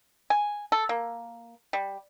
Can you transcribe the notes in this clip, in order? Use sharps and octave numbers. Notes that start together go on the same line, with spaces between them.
G#5
A4
A#3
G3